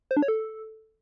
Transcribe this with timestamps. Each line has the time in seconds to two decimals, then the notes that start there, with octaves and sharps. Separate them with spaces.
0.11 C5
0.17 D4
0.22 C#5
0.28 A4